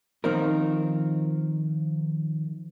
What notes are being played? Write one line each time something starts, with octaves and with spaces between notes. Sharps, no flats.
D#3 F3 C4 D#4 A#4